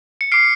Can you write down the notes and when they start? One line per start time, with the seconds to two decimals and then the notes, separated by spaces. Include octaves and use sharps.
0.21 C#7
0.32 D6 F6 C7 D7